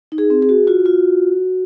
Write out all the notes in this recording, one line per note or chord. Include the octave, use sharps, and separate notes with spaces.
D#4
G#4
C4
G#4
F#4
F4 F#4
F4